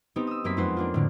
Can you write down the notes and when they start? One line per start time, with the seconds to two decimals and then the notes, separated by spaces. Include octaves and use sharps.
0.16 B3 C4 D#4 G4
0.27 D#6 E6
0.44 F#2 A#3 C4 B5 B6
0.57 F2 G#3 D#4 B4 C5 F#5
0.77 A#3 D4 F4
0.94 A2 D3 A#3